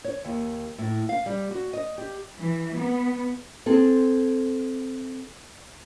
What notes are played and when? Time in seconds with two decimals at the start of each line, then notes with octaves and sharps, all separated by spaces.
0.04 C#5
0.24 D#2
0.78 A2
1.09 F5
1.26 G3
1.51 F#4
1.73 D#5
1.98 G4
2.37 E3
2.77 B3
3.66 C4 G#4 A4